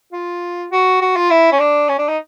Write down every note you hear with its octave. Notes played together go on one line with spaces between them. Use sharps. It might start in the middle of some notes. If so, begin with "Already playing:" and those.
F4
F#4
F#4
F4
E4
C#4
D4
C#4
D4
D#4